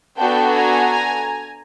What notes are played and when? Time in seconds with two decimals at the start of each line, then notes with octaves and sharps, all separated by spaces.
0.18 B3 D4 F#4 A4 G5 A5
0.51 G#5 A#5